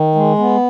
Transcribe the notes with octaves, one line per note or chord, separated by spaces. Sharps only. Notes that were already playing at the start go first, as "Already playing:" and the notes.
Already playing: D#3
G#3
B3